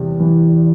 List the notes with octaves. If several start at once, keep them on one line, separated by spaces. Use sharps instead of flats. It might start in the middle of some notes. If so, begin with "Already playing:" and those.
Already playing: E2 C3 G3
E3